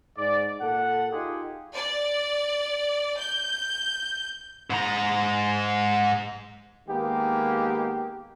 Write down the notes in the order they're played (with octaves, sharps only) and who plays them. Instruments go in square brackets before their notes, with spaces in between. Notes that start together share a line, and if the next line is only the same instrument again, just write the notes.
[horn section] G#2 D5
A#2 A4 F#5
D#4 F4 G4 G#4
[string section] D5
G6
[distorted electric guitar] G#2 A#5
[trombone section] D#3 G#3 A#3 B3 G4